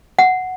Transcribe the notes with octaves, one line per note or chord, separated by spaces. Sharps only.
F#5